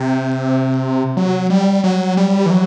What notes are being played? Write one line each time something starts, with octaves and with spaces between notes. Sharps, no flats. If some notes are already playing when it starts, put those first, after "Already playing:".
Already playing: C3
F#3
G3
F#3
G3
E3
F#3